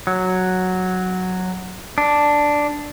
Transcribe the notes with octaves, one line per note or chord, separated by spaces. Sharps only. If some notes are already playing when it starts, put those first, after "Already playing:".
F#3
D4